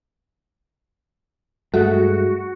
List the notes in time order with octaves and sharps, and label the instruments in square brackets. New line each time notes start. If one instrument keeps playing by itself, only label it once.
[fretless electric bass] G2 G#3 A3 [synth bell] F#4